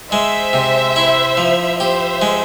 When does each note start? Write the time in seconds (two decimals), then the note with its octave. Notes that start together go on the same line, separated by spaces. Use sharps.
0.11 G#3 C5 E5
0.53 C3
0.96 E4
1.37 F3
1.79 G4 C5 E5
2.22 G#3